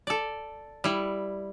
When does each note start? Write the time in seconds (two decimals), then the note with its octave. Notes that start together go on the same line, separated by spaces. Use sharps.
0.07 A4 D5
0.84 G3 E4